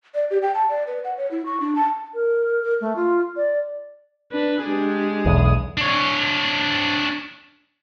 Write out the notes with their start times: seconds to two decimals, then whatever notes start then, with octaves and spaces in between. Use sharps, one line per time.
0.15 D5
0.31 G4
0.42 G5
0.55 A5
0.69 D5
0.87 B4
1.04 F#5
1.17 C#5
1.31 E4
1.46 C#6
1.60 D4
1.75 A5
2.14 A#4
2.63 A#4
2.81 A3
2.96 F4
3.36 D5
4.32 D4 B4
4.62 G#3 D4 G4 G#4
5.26 B1 E2 D#6
5.77 D4 C#5